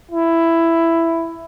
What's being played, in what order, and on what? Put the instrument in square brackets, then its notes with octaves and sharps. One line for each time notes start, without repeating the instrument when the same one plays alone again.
[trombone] E4